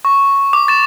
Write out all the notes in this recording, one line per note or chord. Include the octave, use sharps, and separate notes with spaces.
C#6
D6
C#6 A6 E7